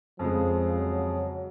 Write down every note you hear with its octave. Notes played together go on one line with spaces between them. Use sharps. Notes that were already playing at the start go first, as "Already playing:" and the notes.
F2 C#3 F3 G#3
F#3